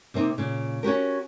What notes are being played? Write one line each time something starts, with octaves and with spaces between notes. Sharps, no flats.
C3 A#3 C4 D#4
A#2 C#3
C#4 F#4 G4 A#4